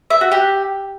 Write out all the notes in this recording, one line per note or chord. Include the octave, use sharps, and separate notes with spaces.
E5
F#4
G4